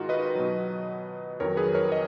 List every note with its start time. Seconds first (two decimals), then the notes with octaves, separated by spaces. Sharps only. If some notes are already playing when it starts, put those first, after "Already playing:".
Already playing: G#2 D#3 G#3 D#4 F4 F#4
0.09 B4 D#5
0.35 B2 F#3
1.40 F2 D#3 F#3 A#4 C#5
1.57 G#4 B4
1.74 A#4 C#5
1.92 D#5